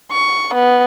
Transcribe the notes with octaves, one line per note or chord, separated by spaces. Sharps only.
C#6
B3